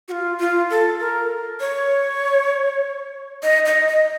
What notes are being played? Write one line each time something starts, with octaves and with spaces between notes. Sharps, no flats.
F#4
F4
F4
A4
A#4
C#5
D#5
D#5
D#5